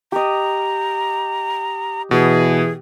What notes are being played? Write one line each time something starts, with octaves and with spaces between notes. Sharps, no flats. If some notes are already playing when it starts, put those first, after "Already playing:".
G4 D#5 A#5
B2 E3 G#4